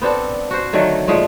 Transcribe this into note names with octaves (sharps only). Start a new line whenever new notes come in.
B3 C4 D4 A4
F#4 C5
D3 D#3 F#3 A3
A#2 F3 G#3 A3